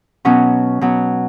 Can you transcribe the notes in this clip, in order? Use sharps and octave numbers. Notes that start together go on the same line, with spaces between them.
B2 F#3 C#4
B2 F#3